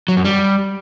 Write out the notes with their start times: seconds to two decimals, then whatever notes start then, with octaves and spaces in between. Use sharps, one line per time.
0.08 F#3
0.17 F#2
0.25 G3